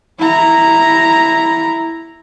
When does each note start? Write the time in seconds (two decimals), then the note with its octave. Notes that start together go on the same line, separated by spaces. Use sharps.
0.19 E4 A#5